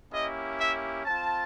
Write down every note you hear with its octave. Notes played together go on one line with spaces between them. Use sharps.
A#3 C#4 E4 G4 D#5
E5
C4 F4 A5